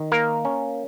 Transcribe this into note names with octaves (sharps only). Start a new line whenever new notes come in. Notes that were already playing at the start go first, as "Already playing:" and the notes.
Already playing: D#3
A#3 A#4
C#4